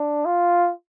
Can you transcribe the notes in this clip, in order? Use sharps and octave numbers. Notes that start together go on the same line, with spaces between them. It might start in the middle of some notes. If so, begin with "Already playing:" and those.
Already playing: D4
F4